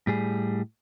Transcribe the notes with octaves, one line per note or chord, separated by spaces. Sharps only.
A2 G3 G#4